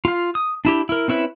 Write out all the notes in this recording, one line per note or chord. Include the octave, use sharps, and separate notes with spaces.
F4 F5
D#6
D4 E4 G4
E4 A#4
C4 C#4 E4 B4 E5